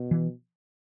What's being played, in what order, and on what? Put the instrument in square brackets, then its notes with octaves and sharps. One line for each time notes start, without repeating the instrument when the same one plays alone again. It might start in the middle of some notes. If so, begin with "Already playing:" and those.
Already playing: [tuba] B2
[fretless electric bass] E3